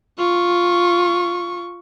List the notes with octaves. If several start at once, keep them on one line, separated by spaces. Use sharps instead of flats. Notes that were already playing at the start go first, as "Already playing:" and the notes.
F4 C#6